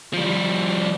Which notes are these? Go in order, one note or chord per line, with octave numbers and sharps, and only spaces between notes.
F3 G3